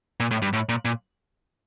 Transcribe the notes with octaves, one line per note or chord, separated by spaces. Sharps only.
A#2
A2
G2
A2
A#2
A#2